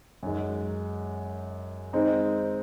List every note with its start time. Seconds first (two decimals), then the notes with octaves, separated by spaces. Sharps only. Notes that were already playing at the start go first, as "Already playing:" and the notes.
0.23 F#2 D#3 G#3
1.93 D#3 G#3 C4 D#4